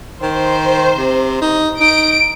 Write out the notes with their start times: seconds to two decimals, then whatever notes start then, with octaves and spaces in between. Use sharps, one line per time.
0.22 D#3 C5
0.98 C3
1.42 D#4
1.80 D#4 D7